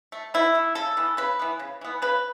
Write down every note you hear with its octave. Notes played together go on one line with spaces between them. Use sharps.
A3
B2 E4
A3
C#3 A4
E3 B3
C#3 B4
E3 B3
C#3
E3 B3
C#3 B4